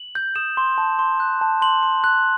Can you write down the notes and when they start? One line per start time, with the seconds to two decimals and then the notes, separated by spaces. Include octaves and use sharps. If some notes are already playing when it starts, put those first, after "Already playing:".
Already playing: F#7
0.15 G6
0.36 D#6 E7
0.57 C6
0.78 A5
0.99 C6
1.20 F#6
1.41 A5
1.62 C6 F#7
1.83 C6
2.04 F#6